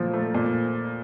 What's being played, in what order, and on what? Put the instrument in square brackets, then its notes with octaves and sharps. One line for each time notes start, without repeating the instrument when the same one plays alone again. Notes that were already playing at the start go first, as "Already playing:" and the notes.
Already playing: [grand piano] A#2 F3 A3
A3
A#2